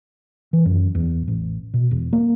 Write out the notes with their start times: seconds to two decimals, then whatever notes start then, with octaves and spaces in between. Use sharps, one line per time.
0.53 E3
0.66 F#2
0.95 E2
1.28 A1
1.74 B2
1.91 E1
2.13 A#3